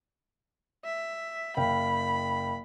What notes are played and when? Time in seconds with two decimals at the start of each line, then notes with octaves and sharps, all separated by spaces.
0.85 E5
1.57 F#1 F5 G5 B5